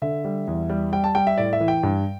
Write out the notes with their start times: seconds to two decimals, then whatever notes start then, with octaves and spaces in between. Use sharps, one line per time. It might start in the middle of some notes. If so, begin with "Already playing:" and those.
0.02 D3 E5
0.25 G3
0.47 E2
0.70 G3
0.92 G3 G5
1.04 A5
1.15 G3 G5
1.27 E5
1.38 A2 D5
1.53 E5
1.60 E3
1.68 G5
1.83 G2